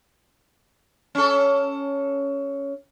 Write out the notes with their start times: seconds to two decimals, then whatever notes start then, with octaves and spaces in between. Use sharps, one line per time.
1.15 C#4 A4